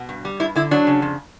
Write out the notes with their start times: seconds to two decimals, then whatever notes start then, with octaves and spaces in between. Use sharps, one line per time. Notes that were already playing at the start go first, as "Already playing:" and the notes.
Already playing: B2
0.09 G2
0.25 G3
0.40 G2 E4
0.56 D3 E4
0.71 F#3 D4
0.87 C#3
1.02 F2